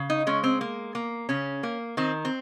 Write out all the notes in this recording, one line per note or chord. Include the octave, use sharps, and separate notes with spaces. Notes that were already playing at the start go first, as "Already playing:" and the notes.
Already playing: C#3
D#4
G#3 C#4
C4
A#3
A#3
C#3 C#4
A#3
D#3 C4
C4